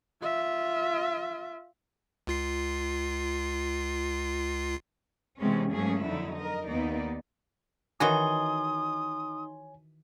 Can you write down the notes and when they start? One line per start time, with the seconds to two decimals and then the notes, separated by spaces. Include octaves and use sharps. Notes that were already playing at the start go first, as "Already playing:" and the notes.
0.22 F4 E5
2.27 C#2 F4 C7
5.39 C3 E3 G#3 B3 C#4
5.73 G#2 F#3 A3 A#3 C#4 G#4
6.04 F2 D3 F#3 D#4 E4
6.38 A#4 D#5
6.68 D#2 A#3 B3 D#4 D5
8.00 D#3 E3 D#4 F#4 C#5 G#5 C6 D#6